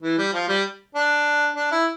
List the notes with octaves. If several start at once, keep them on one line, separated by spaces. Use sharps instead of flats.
E3
G3
F3
G3
D4
D4
E4